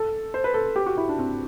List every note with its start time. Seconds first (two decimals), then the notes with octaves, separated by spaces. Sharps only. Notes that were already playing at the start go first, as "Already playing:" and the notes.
Already playing: A4
0.34 C5
0.44 B4
0.54 A4
0.76 G4
0.86 F#4
0.97 E4
1.09 D4
1.18 C4